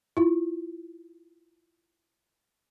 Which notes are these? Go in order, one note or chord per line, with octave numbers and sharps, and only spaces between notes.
E4 F4